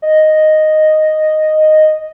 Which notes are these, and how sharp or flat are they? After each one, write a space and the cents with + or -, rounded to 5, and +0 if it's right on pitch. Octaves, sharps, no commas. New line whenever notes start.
D#5 -5